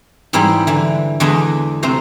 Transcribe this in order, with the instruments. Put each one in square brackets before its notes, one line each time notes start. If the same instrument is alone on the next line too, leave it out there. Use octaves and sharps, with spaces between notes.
[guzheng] G#2 E3 G3 E4 C5 G5
D3 E3
E2 D3 G#3 D4 B4 D#5
C3 A3 C5 A#5